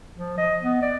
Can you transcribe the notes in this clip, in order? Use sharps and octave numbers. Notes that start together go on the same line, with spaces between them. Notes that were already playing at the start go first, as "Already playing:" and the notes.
F3
D#5
B3
D5